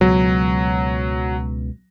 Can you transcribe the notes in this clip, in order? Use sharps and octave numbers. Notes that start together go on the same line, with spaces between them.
C#2 B2 F#3